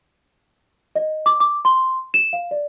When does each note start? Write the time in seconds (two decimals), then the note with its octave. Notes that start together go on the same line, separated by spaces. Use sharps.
0.96 D#5
1.26 D6
1.40 D6
1.65 C6
2.14 E7
2.33 F5
2.51 D5